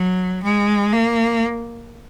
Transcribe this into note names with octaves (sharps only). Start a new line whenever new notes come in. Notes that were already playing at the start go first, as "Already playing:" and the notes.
Already playing: F#3
G#3
A#3